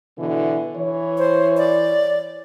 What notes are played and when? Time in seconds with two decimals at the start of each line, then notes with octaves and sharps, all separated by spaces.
0.18 B2 D3 E3
0.76 E3 C#5
1.18 C5
1.57 D5